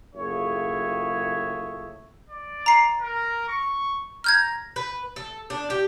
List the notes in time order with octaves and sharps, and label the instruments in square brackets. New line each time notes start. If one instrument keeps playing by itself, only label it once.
[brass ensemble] F#1 A2 F4 G#4 C#5 E5
[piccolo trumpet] D5
[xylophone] A#5 C7
[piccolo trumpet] A#4
C#6
[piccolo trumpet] A#5 [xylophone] F6 G6 G#6
[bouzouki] B4
A4
D4
G4